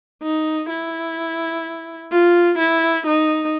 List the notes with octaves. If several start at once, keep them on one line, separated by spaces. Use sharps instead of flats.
D#4
E4
F4
E4
D#4